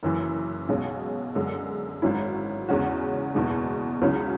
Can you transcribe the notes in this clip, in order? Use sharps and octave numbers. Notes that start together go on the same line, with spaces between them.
F#1 F#2 E3
B1 B2 G#3 C#4
F#2 D3 G#3
G#1 G#2 F#3 C#4 E4
E2 C#3 G#3 C#4 F#4
F#1 E2 B2 G#3
C#2 C#3 F#3 C#4 E4